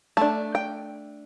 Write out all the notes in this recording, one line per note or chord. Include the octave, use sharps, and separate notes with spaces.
A3 D4 A5
G5